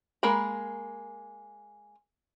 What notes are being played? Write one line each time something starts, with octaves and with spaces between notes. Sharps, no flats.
G#3 A#3 A#4 A#5 B5